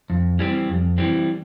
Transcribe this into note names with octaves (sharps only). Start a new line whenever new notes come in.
F2
E3 G3 C4
F2
E3 G3 C4